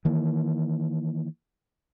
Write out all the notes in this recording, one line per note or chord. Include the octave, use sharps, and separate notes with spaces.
D#3 E3 A#3